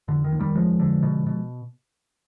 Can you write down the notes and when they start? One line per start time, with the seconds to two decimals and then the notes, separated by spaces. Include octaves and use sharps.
0.08 F1 D3
0.24 D#3
0.32 D#2
0.39 D#3 G3
0.55 F1 F3 G#3
0.80 D3
1.02 B2
1.27 B2